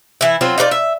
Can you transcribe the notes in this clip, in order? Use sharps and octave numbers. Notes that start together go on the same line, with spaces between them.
E3 E4
F#3 C4 F4
D#4 F4 B4 D5
E5